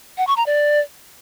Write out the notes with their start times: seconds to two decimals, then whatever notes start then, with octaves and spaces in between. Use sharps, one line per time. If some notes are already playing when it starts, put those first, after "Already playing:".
0.18 F#5
0.27 C#6
0.37 A#5
0.46 D5